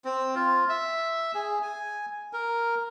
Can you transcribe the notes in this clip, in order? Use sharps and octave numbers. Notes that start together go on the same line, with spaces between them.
C4
F4
E5
G#4
G#5
A#4